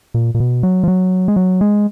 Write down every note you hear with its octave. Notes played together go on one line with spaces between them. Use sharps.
A#2
A#2
B2
F#3
F3
F#3
G#3
F#3
G#3